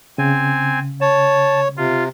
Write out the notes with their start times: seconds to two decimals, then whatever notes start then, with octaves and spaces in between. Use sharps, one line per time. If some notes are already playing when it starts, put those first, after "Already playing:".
0.18 C#3 C4 G#5
1.01 C#5 A5
1.77 C3 F4